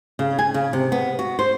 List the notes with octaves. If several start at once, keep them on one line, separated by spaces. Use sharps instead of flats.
C#3
G#5
C#3
C3
B3
F#4
C5